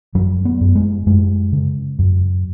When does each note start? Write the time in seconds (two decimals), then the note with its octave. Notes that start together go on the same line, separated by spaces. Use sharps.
0.15 F#2 F#3
0.45 B3
0.61 F#2
0.75 G#3
1.06 F#2 G#3
1.52 C#3
1.99 F#2